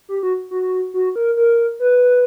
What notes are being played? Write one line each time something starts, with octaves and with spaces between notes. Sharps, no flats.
G4
F#4
F#4
F#4
A#4
A#4
B4